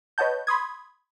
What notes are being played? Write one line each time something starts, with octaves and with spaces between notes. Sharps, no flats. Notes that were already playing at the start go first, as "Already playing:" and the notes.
B4 C#5 D#5 F#5 A5 G6
B5 C6 D#6 G#6